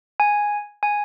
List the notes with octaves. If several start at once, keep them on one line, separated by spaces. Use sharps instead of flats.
G#5
G#5